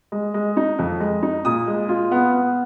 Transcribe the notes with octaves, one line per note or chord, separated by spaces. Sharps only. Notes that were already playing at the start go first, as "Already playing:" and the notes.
G#3
G#3
D#4
F2
G#3
D#4
A#2 D#6
G#3
F4
B3
B3